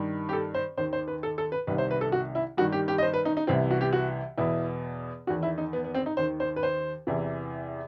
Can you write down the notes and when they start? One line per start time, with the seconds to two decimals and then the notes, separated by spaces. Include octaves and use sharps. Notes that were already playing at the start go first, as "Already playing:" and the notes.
Already playing: G2 D#3
0.29 G4
0.33 A4
0.54 C5
0.77 D#2 D#3 C5
0.93 C5
1.08 B4
1.23 A4
1.38 A4
1.52 B4
1.67 C2 C3 D#3 B4
1.78 C5
1.91 B4
2.01 A4
2.12 F#4
2.35 E4
2.57 G2 D#3 F#4
2.72 G4
2.88 G4
2.98 D#5
3.03 C5
3.14 B4
3.25 D#4
3.37 D#4
3.47 C2 C3 E3 C4
3.71 F#4
3.81 G4
3.93 F#4
4.38 E2 B2 E4
5.27 E2 D#3 F#4
5.43 E4
5.58 D#4
5.73 B3
5.84 B3
5.94 C4
6.06 D#4
6.17 D#2 D#3 C5
6.40 C5
6.56 B4
6.63 C5
7.07 E2 C3 E3